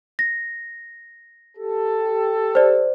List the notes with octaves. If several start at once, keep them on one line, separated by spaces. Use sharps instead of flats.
A#6
G4 A4
C5 D5